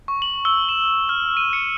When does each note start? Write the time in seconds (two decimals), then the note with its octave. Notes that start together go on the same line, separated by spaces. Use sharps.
0.08 C#6
0.22 F#7
0.45 E6
0.69 E7
1.09 F6
1.37 D#7
1.53 C#7